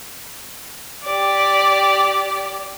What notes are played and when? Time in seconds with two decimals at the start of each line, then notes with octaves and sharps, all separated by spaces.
1.04 G4 D5